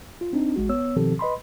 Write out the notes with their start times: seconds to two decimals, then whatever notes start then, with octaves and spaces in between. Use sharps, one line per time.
0.21 F4
0.33 C4 D4 D#4
0.56 A1 G#3 F#4
0.69 B3 C#5 E6
0.96 B2 D#3 F3 C4 G4 A4
1.19 B4 D#5 B5 C6